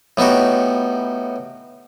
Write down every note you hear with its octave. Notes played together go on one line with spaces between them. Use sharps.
A2 B3 D#4 F#4 G4